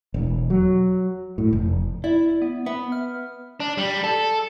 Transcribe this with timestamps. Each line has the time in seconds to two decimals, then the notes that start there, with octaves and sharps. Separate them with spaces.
0.14 E1
0.50 F#3
1.38 A2
1.53 F1
2.04 E4 D5
2.42 B3
2.66 B3 E5
2.92 F6
3.60 D4
3.78 G3
4.04 A4